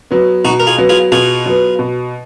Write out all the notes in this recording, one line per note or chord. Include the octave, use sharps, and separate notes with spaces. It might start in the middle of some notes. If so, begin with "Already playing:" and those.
F#3 B3
B2 D#4 F#4
A#4
F4 G#4
F#3 B3
F4 G#4
B2 F4 G#4
F#3 B3
B2